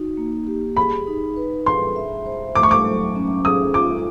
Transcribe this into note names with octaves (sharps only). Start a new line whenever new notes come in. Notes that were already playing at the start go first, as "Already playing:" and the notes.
Already playing: D#4 F#4
A#3
G4
G#4 B5
D#4
B4
G#4 C6
E5
C5
A3 D6
C#6
D6
F#3
C#4
G#4 D#6
F4 D6